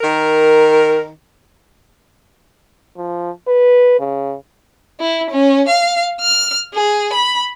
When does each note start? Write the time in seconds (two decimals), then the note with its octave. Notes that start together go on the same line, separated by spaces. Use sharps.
0.01 D#3 A#4
2.97 F3
3.47 B4
3.99 C#3
5.00 E4
5.30 C#4
5.68 F5
6.21 F6
6.74 G#4
7.13 B5